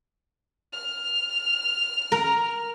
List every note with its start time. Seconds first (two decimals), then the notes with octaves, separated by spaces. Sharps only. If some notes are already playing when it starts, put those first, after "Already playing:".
0.73 F6
2.12 A#4